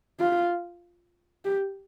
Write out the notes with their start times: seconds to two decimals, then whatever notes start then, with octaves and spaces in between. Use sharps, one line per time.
0.20 F4
1.45 G4